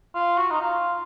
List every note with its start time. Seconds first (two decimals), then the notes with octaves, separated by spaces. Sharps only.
0.15 F4
0.37 F#4
0.51 D#4
0.61 F4